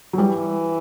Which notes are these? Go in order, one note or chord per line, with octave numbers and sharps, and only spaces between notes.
F#3
E3 G3